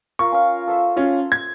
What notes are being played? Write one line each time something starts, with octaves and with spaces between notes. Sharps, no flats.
F4 A#4 C#6
C#4 F5
A4 C5 E5
C#4 F4
G#6